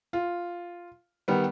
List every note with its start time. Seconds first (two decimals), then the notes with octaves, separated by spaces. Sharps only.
0.13 F4
1.28 D#3 G3 B3